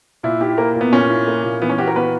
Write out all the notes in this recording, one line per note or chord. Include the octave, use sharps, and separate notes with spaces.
A#2 E4
E4 G4
A#3 A#4
A#2
B3
A#2 C#4
E4
A#3
A#2
E3 B3
C#4
F#4 G4
A#4
B3 B4